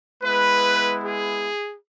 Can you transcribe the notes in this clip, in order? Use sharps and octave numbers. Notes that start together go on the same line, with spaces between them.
G#3 B3 E4 B4
G#4